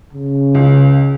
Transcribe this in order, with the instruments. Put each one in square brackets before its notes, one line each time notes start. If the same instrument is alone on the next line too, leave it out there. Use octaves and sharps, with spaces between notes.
[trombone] C#3
[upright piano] C#2